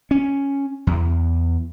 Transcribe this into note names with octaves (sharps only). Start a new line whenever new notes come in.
C#4
E2